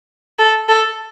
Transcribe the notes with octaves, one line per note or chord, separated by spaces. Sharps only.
A4
A4